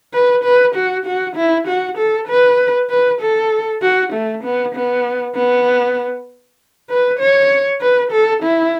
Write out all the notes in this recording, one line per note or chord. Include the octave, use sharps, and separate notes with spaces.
B4
B4
F#4
F#4
E4
F#4
A4
B4
B4
A4
F#4
A3
B3
B3
B3
B4
C#5
B4
A4
E4